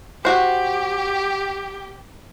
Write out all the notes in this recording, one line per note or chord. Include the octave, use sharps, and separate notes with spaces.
F#4 G4 C5